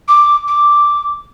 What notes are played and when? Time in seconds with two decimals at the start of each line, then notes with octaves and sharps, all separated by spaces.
0.08 D6
0.47 D6